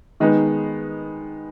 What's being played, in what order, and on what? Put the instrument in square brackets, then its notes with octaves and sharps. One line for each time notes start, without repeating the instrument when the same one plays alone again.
[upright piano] D#3 G#3 B3 D#4